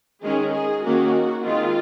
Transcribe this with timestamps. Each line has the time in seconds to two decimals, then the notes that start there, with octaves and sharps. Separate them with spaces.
0.22 D#3 G#3 C#4 G#4
0.52 G#4
0.83 D#3 A#3 C#4 F#4
1.44 D#3 G#3 C4 F4